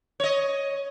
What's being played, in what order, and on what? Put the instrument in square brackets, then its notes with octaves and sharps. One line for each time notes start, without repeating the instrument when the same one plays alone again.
[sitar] C#5 D#5